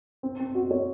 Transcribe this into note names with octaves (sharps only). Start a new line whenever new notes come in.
C4
C4
F#4
C#5